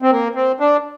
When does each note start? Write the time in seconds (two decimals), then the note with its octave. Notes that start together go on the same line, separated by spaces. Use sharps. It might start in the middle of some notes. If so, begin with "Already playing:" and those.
0.02 C4
0.11 A#3
0.35 C4
0.60 D4